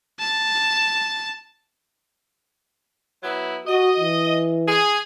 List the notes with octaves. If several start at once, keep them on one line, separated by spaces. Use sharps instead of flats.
A5
F#3 B3 E4
F#4 D#5
E3
G#4